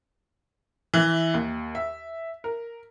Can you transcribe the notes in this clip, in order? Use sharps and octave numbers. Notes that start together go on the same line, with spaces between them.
E3
D#2
E5
A#4